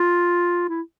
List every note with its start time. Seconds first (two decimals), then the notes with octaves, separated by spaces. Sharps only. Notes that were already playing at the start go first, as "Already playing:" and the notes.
Already playing: F4
0.69 E4